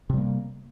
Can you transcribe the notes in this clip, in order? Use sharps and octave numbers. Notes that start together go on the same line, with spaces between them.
C3 G3 A#3